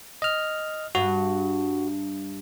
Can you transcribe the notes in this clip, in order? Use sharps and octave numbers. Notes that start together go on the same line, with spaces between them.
D#5 F6
G2 F#4